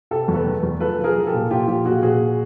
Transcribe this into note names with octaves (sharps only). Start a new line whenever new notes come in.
C3 G4 A4
E2
A4 B4
D#3
E2
F3 A4 B4
F3
G#4 A#4
F3
G4 A4
A#2
A#2 F4 G4
F3 F4 G4
A#2 F#4 G#4
A#2 F#4 G#4